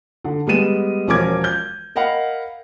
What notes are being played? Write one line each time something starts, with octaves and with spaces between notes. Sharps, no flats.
D3
G3 G#3 B3 D#7 E7
E1 F3 C#4 A#4 D6 G#6
G6
A#4 D#5 F5 F#5 B5